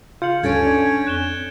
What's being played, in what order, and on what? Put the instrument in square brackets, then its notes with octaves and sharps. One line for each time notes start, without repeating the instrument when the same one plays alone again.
[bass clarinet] C#3 [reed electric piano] F4 F5 [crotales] G6 C#7 F#7
[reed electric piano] D2 G2 [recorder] C#4 [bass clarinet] A4 [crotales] G#6 A6 D7
[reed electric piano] D4
[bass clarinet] F2 [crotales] F#6 E7 G7